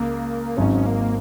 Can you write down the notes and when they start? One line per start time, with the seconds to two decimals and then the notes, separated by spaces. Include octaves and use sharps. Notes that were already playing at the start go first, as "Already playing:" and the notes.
Already playing: C#2 A#3
0.57 G#1 G#2 F#3 C#4 D#4
0.86 A#3